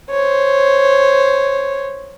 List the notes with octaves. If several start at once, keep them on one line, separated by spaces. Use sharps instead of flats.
C5 C#5